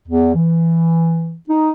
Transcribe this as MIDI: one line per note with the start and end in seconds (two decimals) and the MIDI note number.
0.08 0.32 40
0.35 1.34 52
1.50 1.73 63